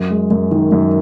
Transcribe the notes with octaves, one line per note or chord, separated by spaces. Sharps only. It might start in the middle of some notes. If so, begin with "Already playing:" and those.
Already playing: F#2
G#3
F#2
D#3
F#2